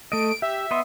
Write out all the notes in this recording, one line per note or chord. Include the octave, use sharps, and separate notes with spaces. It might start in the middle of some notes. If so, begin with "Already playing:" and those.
A3 D#5 D7
G4 E5
B3 D#5 C6